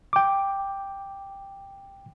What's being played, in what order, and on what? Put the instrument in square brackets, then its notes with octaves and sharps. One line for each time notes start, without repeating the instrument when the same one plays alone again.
[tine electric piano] G5 D6